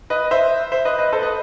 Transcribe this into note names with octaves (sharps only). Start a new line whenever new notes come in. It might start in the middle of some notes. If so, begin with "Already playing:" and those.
B4 D#5
C5 E5
C5 E5
B4 D#5
B4 D#5
A4 C5
B4 D#5